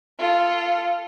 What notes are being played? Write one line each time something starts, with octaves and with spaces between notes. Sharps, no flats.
F4 A4